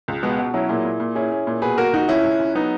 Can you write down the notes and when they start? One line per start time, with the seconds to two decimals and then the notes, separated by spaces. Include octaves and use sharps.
0.08 C#2
0.23 B2 G#3 B3
0.38 B2
0.54 F#3 C#4 E4
0.69 A#2 E4 G#4
0.85 A#2
1.00 A#2
1.15 C#4 E4 G#4
1.31 C#4
1.47 A#2
1.62 B2 G#4 B4
1.77 A#3 F#4 A#4
1.93 C#2 D#4 F#4
2.09 C#2 C#4 E4
2.24 C#2
2.40 C#2
2.55 F#3 B3 D#4